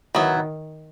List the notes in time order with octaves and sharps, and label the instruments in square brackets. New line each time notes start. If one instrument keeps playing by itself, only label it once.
[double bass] D#3 [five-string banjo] F#3 B3 E4